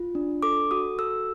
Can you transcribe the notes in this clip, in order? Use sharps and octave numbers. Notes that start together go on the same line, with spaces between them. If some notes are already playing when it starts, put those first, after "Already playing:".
Already playing: F4
D4
A4 D6
F#4 D#6
A4 E6